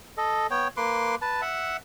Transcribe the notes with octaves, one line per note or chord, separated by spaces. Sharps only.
A4 D#5
B3 C#5 G5
A#3 B4 C6 D6
B4 A5
E5 F#5